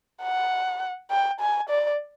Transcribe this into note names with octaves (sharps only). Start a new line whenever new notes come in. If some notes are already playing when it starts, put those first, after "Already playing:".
F#5
G5
G#5
D5